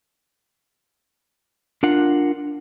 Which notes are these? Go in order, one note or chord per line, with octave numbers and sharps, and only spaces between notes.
D4 F4 A#4 F#5